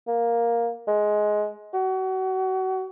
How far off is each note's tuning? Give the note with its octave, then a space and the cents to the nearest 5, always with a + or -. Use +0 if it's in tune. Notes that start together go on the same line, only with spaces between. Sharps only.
A#3 +5
G#3 +15
F#4 +30